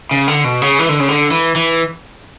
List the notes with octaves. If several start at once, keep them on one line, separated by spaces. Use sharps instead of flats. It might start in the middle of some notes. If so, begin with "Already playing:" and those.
C#3
D3
B2
C#3
E3
D3
C#3
D3
E3
E3